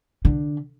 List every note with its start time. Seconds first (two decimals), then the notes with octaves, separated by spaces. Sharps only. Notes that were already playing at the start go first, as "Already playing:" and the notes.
0.25 D3